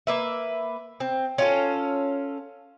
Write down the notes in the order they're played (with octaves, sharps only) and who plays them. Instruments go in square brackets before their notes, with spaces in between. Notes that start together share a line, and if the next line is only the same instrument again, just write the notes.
[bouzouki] A#3 B4 E5
C4
C#4 F4 A4